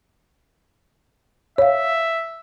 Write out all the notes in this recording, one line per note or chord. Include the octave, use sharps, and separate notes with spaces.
C#5 E5 F5